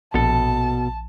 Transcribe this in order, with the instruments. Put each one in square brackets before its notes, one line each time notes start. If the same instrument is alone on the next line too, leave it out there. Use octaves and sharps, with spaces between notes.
[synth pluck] A#1 [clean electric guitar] B2 A4 [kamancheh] A5